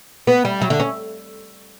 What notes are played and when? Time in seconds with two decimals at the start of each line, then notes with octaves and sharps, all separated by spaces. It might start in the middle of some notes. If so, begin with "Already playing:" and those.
0.27 B3
0.45 G3
0.61 F#3
0.70 D3
0.80 C#4